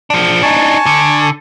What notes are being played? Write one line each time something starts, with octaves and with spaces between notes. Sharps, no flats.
F3 D4
D4 D#4 G#5 A5 C#6
D3